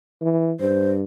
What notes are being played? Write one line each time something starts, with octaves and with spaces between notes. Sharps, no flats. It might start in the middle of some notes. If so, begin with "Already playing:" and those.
E3
G2 C5